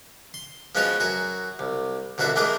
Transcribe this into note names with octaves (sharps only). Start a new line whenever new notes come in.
C6
F3 G#3 B3 C#4 F#4 C#5
F#2 F#4 G#5 A#5
C2
C2 B2 D3 F#4 E5 D6
E3 G#3 A3 D4 A#4 D6